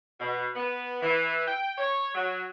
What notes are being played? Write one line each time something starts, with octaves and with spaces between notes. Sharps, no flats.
B2
B3
E3
G5
C#5
F#3